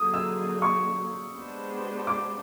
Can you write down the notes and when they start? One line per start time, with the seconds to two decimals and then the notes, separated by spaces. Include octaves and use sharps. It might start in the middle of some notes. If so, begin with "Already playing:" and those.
Already playing: D3 F#3 A#3 D#4 G#4 D#6
0.14 E6
0.62 C#6
1.34 G#3 B3 D4 G4 C5
2.07 D6